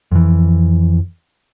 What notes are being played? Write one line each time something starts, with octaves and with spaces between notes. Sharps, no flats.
F2 E3